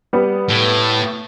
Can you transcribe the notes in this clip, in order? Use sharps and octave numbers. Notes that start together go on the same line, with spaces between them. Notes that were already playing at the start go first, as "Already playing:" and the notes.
G3 B3
A2